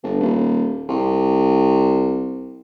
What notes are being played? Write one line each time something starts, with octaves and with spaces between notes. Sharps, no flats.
G1
D#1
C2